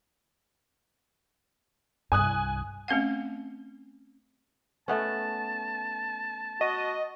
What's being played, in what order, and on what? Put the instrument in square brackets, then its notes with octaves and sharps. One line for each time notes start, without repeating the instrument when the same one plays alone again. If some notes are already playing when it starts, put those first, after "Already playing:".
[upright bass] C2 G2 [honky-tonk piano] G#5 D#6 F#6
[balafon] A3 C4 C#4 F5 F#5
[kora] A3 B3 C#4 [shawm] A5
[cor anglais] F#4 [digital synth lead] D#5